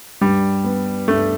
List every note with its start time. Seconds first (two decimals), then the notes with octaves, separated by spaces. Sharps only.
0.21 G2 G3
0.64 B3
1.08 G2 A3